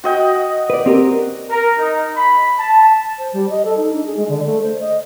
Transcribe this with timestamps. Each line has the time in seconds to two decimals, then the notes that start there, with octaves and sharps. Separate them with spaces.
0.04 F#4 D#5 G5
0.70 B4 D5
0.86 C4 G4 A#4
1.50 A#4
1.79 D#4
2.16 B5
2.58 A5
3.18 C5
3.33 G3
3.50 D#5
3.65 A4
3.77 D#4
3.93 D4
4.06 G#4
4.17 G#3
4.29 D3
4.46 A3
4.62 C5
4.80 D#5